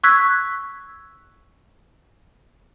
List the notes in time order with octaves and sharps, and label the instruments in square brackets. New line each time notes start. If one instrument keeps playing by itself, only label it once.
[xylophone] C#6 E6 F#6 G#6 B6